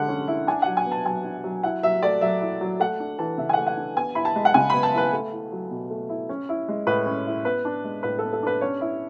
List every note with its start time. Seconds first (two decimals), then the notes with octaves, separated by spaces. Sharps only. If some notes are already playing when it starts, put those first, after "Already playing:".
Already playing: D3 G#3 F#5
0.08 C#4
0.28 E4
0.47 D4 G#5
0.62 F#3 F#5
0.77 G#5
0.86 B3
0.92 A5
1.06 F#3 G#5
1.25 D4
1.44 F#3
1.63 E4 F#5
1.83 F#3 E5
2.03 A3 D5
2.21 F#3 E5
2.41 E4
2.61 F#3
2.80 A3 F#5
3.00 D4
3.19 E3 A5
3.38 C#3 E5
3.49 G#5
3.53 A3 F#5
3.67 F#5
3.77 D4
3.96 B3 G#5
4.15 E4 B5
4.25 A5
4.35 G#3
4.45 F#5
4.54 C#3 G#5
4.70 B3 B5
4.83 A5
4.93 E4 B4
5.13 A3
5.32 E4
5.52 F#3
5.71 B2
5.90 A3
6.09 E4
6.29 C#4
6.49 E4
6.68 G#3
6.87 A2 B4
7.06 C#4
7.27 E4
7.45 B3 B4
7.65 D4
7.84 G#3
8.03 A2 B4
8.19 B3 A4
8.33 A4
8.43 D4 B4
8.61 C#4 C#5
8.81 E4